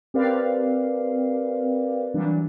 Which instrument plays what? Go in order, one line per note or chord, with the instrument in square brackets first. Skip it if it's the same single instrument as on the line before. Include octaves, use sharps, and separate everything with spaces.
[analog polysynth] C4 G4 A#4 B4 D5 F5
E3 F#3 G3 D4